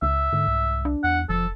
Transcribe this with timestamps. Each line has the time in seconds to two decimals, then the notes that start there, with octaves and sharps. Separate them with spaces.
0.02 C#2 E5
0.33 G#2 D3
0.48 C2
0.85 D4
1.04 E2 F#5
1.29 F1 F3 A4